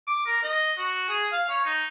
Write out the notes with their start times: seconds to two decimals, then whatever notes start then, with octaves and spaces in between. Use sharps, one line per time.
0.07 D6
0.26 A#4
0.43 D#5
0.78 F#4
1.08 G#4
1.32 F5
1.49 C#5
1.65 D#4